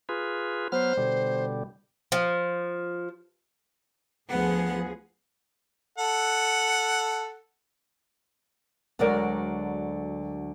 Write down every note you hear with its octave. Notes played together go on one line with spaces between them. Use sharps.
F4 G#4 B4
F#3 B3 C5 F6
B2 D3 G3
F3
D2 F3 B3 G#4 F#5
A4 F#5
D2 D3 F#3 G#3 A#4 D5